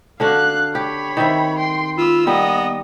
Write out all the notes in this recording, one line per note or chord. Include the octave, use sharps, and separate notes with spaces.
D3 D4 F#4 F5 F#6
G4 C#5 B5
D#3 C4 E5
G5 C6
F4 B5 E6
G3 A#3 B3 D#5